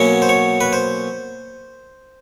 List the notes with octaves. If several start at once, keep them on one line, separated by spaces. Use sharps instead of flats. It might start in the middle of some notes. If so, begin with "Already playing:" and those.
Already playing: B2 F#3 A#3 C#4 C#5
C5
C#5
B4
C5